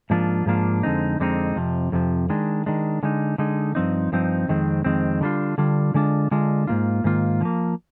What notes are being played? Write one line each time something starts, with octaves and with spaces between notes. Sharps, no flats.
G#2 F3 A#3 D4 F4
G#2 F3 A#3 D4 F4
F2 D3 G#3 C4 D#4
F2 D3 G#3 C4 D#4
F2 C3 F3
F2 C3 F3
D#3 G#3 D4
D#3 G#3 D4
D3 G#3 D#4
D3 G#3 D#4
G2 F3 C4 D#4
G2 F3 C4 D#4
F2 D#3 G#3 C4
F2 D#3 G#3 C4
D3 G3 D4 F4
D3 G3 D4 F4
D3 G#3 D4 F4
D3 G#3 D4 F4
G#2 D#3 A#3 F4
G#2 D#3 A#3 F4
D3 F3 A#3